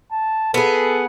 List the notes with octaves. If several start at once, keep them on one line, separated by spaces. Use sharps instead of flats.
A5
B3 G#4 A4